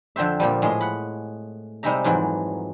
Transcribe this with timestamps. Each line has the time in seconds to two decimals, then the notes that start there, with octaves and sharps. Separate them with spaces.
0.16 F2 D3 C4 C5 E5
0.40 A#2 F3 G3
0.62 A2 G#3 G#4 C6
0.81 F#5 B5
1.83 C3 G3 G#3 D#4 E5 A#5
2.04 F2 G#2 E3 F#3